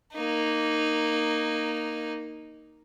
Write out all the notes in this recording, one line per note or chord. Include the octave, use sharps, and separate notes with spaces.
A#3 D#4